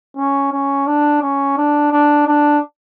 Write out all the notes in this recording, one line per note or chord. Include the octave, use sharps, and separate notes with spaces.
C#4
C#4
D4
C#4
D4
D4
D4